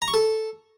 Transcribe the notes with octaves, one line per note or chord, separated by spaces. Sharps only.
A#5
C#6
A4